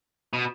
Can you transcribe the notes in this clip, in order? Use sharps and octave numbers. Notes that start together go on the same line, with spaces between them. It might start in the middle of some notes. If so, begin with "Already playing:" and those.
B2